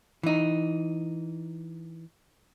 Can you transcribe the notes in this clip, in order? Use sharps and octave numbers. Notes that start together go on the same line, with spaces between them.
E3 D#4